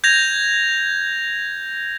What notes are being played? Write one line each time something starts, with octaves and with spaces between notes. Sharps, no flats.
G6 G#6 A#6 F7